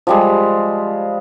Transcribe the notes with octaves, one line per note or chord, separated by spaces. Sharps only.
F3 G3 G#3